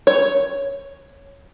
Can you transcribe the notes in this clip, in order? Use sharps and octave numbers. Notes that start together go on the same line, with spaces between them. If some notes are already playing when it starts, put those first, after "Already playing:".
C#5